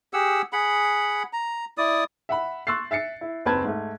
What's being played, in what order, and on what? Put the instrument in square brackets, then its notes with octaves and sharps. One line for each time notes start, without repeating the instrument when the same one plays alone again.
[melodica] G4 G#4 F#5 E6
G#4 F#5 B5
A#5
E4 D5 D#6
[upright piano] E5 F#5 B5
C6 C#6 E6 F#6 A6 C7
E5 A6 C7 C#7
E4
F#1 D#2 C4 B4 A5 G#6
G#2 A3